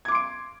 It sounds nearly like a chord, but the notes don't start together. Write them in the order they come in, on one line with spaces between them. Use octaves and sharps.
G#6 D6 C6 D7